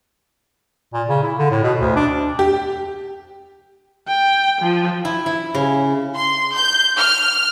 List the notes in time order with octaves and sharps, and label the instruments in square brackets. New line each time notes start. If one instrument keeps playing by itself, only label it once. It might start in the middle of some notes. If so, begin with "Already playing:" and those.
[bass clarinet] A#2
C#3
E4
D3
A2
B2
D2
D4
[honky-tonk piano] G4
[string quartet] G5
F3
[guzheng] E4
E4
C#3
[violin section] C6
G6
F6